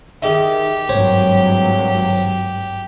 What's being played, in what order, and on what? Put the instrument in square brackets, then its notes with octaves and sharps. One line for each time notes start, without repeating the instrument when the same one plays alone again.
[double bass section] D#3 [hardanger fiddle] G4 [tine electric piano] G#4 D#5 E5
[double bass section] G#1 G2 F#3 [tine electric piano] C5 C#5